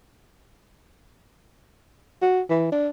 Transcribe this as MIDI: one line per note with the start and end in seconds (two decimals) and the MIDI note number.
2.22 2.41 66
2.49 2.69 52
2.72 2.88 62